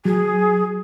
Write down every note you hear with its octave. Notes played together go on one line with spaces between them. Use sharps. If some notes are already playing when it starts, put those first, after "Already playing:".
F#3 G#4